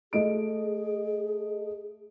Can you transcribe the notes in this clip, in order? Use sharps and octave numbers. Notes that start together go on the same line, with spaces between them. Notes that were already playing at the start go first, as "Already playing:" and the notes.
A3 G#4 D#5 D7